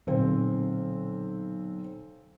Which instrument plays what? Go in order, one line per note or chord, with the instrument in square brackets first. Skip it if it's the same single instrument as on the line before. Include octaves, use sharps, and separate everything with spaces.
[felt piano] B1 C4 [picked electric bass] A#2 D3